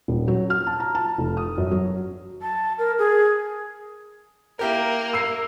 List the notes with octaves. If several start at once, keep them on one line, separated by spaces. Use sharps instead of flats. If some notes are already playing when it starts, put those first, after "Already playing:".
D#1
F#3
F6
A5
A#5
A5
F1
D#6
F#2
F#3
A5
A#4
G#4
A#3 E4 G4 A#4
E6 C7